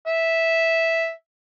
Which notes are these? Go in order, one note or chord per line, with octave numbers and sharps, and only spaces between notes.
E5